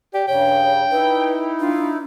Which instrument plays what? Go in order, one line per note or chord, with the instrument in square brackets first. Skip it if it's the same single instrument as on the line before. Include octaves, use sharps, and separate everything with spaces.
[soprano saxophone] G4 [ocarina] D5
[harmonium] G2 C#3 [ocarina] C#5 [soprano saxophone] G5
[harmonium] D#4 E4 [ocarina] B4
[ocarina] D4 [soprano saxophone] F4